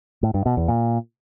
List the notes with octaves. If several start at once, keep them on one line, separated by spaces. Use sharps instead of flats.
A2
G2
B2
E2
A#2